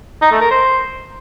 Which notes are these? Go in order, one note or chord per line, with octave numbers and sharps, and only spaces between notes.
D#4
A3
A#4
C5